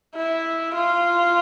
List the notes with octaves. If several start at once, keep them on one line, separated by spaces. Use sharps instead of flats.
E4
F4